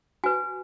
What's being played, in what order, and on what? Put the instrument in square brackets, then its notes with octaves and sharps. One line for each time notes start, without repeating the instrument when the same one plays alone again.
[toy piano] F#4 B4 G#5